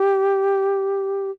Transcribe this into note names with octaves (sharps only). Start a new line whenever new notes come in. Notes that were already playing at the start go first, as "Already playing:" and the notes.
Already playing: G4